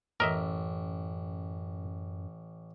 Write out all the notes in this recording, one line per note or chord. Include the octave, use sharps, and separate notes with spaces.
A1 F#2 A#4 D#5 E5